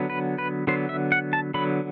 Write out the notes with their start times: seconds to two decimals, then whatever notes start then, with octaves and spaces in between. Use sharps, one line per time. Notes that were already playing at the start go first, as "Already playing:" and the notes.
Already playing: D3 F#3 B3
0.10 B4
0.38 B4
0.67 D3 F#3 B3 C5
0.89 E5
1.12 F#5
1.33 A5
1.54 D3 F#3 B3 B5